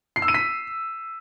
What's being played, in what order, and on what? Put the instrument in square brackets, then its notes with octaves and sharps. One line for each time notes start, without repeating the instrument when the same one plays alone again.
[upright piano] C7
E6
D#7
B6